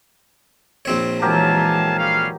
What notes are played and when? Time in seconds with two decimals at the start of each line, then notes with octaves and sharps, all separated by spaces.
0.85 A#1 C4 C#5
1.22 E3 F#3 G#3 G4 A#4 F5 G#5 A5
1.98 G3 C#4 F5